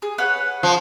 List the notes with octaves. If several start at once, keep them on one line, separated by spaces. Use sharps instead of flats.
G#4
B4 C#5 F#5
F3